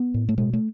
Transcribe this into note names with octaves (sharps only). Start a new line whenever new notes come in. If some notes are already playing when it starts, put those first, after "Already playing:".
Already playing: B3
A2
A3
B2 G#3
A3